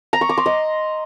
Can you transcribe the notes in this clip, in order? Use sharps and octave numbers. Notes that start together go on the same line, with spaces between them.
A#5
C#6
D6
C6
D#5